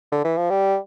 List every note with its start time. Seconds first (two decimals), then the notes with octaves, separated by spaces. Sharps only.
0.12 D3
0.25 E3
0.37 F3
0.50 G3